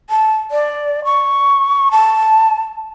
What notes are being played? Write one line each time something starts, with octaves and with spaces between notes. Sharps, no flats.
A5
D5
C#6
A5